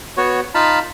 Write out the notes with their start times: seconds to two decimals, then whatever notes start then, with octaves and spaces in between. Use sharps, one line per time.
0.17 B3 F#4 C#5
0.54 D#4 F4 F5 A5 B5